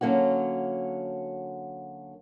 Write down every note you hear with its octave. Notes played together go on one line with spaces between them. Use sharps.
D3 F#3 A#3 C#4 F#4